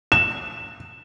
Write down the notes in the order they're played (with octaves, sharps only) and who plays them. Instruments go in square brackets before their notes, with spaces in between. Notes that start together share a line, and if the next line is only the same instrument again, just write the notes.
[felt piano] E7